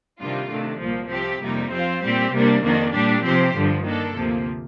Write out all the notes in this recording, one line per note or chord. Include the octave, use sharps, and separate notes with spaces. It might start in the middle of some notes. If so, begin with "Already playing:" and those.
C3 D#3 G3 D4 F4
C3 D#3 A3 D4
C2 A#2 F3 A#3
C2 C3 F3 C4 G4
F2 C3 G3 A#3 D#4
F3 C4 F4 C5
A#2 G3 C4 G4
C3 G3 A#3 D4
F2 D#3 A#3 D4
A#2 G3 D4 G4
C3 F3 C4 G4 C5
G2 D3 F3
D#3 A#3 D4 A4
D2 C3 F3 A#3